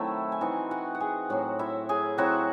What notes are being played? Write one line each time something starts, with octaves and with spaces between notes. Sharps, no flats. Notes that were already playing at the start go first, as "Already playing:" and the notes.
Already playing: D#3 F#3 A3 C4 E4 E5
G#5
E3 C4 D#4 F#4 F#5
F#4 F#5
F#5
G#4 G#5
A2 F#3 C4 F#4 F#5
E4 E5
G#4 G#5
F#3 C4 E4 F#4 F#5